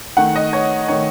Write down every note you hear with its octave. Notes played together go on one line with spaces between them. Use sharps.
D#3 A3 F#5
D#5
C#5
D#3 A3 C#5